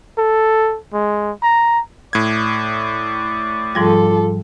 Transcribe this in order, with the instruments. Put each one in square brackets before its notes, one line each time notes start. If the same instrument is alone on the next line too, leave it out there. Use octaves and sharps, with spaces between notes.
[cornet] A4
G#3
A#5
[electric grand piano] A2 G#6 [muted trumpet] D5
[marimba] G#2 F3 G3 [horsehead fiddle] F4 A4